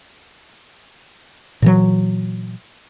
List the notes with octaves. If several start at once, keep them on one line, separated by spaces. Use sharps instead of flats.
A#2 E3 F#3